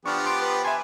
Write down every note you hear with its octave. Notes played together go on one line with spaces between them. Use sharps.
F3 B3 D4 G4 C#6 F6 F#6
C6 D6
B4
E5 G#5 B5 C6